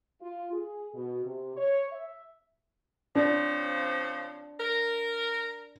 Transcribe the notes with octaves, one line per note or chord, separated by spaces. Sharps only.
F4
G#4
B2
C3
C#5
E5
C#3 F3 C4 D4
A#4